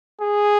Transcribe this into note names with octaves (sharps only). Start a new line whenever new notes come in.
G#4